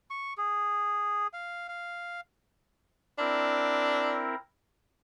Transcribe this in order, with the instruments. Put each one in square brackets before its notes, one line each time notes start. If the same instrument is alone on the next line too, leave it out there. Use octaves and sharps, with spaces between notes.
[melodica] C#6
G#4
F5
F5
[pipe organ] C4 E4 A#4 [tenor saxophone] D4